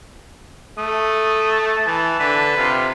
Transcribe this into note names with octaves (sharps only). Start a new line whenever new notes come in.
A3 D#6
A5
E3 A5
D3 B4
C3 F4